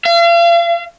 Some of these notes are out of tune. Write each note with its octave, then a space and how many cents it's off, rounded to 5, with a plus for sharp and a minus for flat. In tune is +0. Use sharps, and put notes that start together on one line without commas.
F5 -40